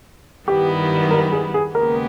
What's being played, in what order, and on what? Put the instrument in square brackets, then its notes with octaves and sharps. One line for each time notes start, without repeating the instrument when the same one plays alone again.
[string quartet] G2 D#3 G3 B3 E4 [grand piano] G4
[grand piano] A#4
G#4
G#4
[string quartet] D#2 C#3 G#3 B3 G4 [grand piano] A#4